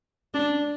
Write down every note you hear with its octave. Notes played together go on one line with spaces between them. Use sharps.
D4